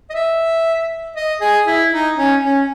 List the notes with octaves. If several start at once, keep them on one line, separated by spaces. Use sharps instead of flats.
D#5
E5
D#5
G#4
E4
D#4
C#4
C#4